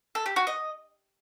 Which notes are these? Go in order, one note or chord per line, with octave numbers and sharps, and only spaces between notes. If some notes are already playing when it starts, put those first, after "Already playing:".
A4
G4
F#4
D#5